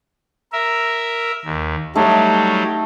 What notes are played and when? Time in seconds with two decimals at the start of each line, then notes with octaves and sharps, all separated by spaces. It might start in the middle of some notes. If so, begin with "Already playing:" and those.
0.53 A#4 E5
1.45 D#2
1.95 F#3 G3 A3 D#4